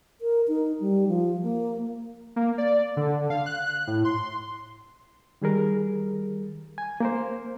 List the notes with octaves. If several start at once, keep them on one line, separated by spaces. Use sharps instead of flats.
A#4
D#4
G3
F3
A#3
A#3
D5
D3
F5
F#6
A2
C6
D#3 G3 G#4 A#4
G#5
A#3 A#4 C5